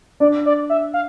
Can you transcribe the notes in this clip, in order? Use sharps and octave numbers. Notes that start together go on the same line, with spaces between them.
D4 D5
D5
E5
F5